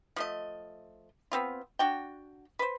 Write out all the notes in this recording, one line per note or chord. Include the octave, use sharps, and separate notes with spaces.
F3 A3 D#5
B3 C4 F4
D4 F#4 G5
B4 C5